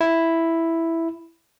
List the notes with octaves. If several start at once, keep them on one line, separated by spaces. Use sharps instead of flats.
E4